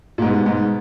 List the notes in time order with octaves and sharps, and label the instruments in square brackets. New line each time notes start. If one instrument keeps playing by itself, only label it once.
[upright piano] A#2
[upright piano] G#2 [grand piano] B2 G3 B3
[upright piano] G#2